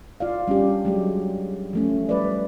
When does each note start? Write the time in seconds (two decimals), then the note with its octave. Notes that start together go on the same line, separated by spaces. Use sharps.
0.20 F4 D5 F5
0.48 G3 C#4 D4 G4
0.85 F#3 G#3 G4
1.73 F3 A3 C#4
2.09 G3 B4 D5